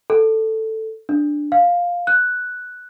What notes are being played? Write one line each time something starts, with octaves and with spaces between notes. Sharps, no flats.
A4
D4
F5
F#6